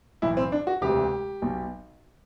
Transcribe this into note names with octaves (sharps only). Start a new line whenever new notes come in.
B1 A2 E3 E4
C4
D4
F#4
E1 D2 C3 G4
B1 B2